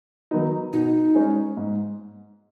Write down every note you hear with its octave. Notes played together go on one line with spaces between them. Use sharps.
D#3 F#3 B3 D#4
B2 D#4
G#3 C#4 G#4
G#2